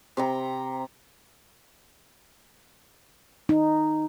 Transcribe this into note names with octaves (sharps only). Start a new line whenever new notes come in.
C3 G5 A#5
D#4